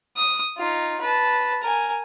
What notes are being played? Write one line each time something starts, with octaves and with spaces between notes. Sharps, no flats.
D#6
D#4 F4
B4 A5
A#4 G#5